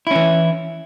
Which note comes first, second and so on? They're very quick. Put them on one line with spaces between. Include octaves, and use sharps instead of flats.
E4 C#4 E3